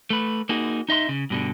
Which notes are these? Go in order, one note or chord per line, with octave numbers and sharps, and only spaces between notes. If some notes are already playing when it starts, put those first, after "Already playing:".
A3 B4
A#3 D#4 F#4 G#4
D#4 D#5 E5 C6
C#3
G2 B2 D3